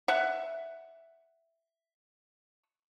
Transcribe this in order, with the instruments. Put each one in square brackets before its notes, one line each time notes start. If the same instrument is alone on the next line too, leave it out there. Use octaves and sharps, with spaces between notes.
[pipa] E5 F#5